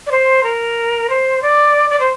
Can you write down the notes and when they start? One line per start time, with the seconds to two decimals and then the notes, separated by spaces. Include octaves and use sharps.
0.07 D5
0.11 C5
0.43 A#4
1.10 C5
1.42 D5
1.90 D5
2.00 C5